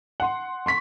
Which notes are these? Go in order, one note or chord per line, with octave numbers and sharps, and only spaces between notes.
F#5 C6
C6 C#6 B6